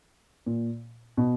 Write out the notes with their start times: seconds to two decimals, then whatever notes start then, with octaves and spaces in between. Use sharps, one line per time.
0.46 A#2
1.17 B2